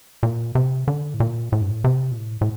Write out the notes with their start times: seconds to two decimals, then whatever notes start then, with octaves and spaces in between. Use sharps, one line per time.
0.23 A#2
0.55 C3
0.88 D3
1.14 A2
1.20 A#2
1.52 A2
1.61 G2
1.71 A2
1.84 C3
2.12 A#2
2.17 A2
2.41 A2